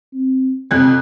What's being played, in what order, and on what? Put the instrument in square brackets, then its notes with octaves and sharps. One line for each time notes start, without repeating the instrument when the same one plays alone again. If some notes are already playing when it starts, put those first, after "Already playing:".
[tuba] C4
[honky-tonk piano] F2 F#6 G#6 [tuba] C3